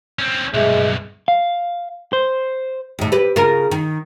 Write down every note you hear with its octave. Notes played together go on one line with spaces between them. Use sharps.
C4 C#4
B1 G2 G#3 E5
F5
C5
D#2 A2
G4 B4
C#3 F4 A#4
D#3